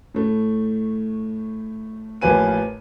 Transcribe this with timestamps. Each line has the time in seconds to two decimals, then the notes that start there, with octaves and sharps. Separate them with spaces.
0.14 A2 A3
2.21 A1 F3 A#3 B4 G#5 D#7